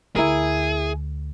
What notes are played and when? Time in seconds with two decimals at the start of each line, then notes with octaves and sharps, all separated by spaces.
0.16 D2 E4 G#4 A#4